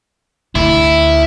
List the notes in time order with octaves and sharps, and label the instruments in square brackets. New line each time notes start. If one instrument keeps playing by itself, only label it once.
[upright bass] D2 [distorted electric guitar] E4